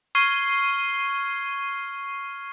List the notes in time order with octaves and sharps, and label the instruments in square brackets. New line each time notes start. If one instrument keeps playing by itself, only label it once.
[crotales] C#6 F6 G#6 C7 D#7 G7